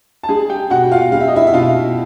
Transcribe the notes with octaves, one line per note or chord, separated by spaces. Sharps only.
A5
G3 G#4 G#5
G4 G5
B2 F#4 F#5
F4 F5
G3 F5
E5
D#5
E4 E5
E5
B2 F4 F5